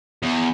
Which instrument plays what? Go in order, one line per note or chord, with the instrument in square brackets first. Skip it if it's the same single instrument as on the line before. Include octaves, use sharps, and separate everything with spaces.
[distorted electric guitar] E2